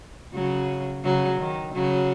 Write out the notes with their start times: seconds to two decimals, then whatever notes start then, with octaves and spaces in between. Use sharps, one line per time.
0.34 C#3 F#3
1.04 C#3 F#3
1.40 D#3
1.75 C#3 F#3